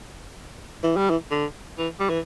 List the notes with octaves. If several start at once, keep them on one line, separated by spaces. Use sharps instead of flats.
E3
G3
E3
D3
E3
G3
E3